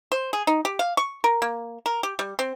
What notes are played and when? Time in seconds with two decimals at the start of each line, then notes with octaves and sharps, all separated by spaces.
0.12 C5
0.33 G#4
0.47 D#4
0.65 G4
0.79 F5
0.97 C#6
1.24 A#4
1.42 A#3
1.86 A#4
2.03 G4
2.19 G3
2.39 C4